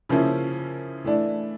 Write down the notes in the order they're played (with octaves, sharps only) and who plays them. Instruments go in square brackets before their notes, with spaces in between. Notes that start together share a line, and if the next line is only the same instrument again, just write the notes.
[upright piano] C#3 F3 A#3 C#4 E4
E3 A3 D4